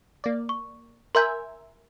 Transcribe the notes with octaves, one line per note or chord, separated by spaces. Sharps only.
A#3 D5
C#6
A#4 E5 G#5 C6 G6